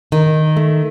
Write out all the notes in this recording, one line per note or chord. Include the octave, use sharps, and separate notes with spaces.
D#3
A3